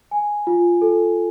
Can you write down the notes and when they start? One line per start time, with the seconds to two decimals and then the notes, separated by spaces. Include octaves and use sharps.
0.11 G#5
0.47 F4
0.82 A4